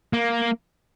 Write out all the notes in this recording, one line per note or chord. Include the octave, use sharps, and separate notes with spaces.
A#3